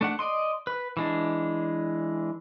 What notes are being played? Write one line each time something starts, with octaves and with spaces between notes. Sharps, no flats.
A3 D4 F#5
D5 D#5 C6
B4
E3 G#3 D4